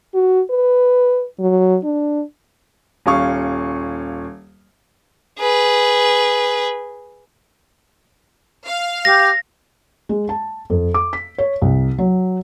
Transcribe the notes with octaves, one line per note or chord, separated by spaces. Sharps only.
F#4
B4
F#3
D4
D#1 C#4 F5 C#6
G#4 B4
F5
G4 A#6
G#3
A5
F2
D6
B6
C#5
C2
F#3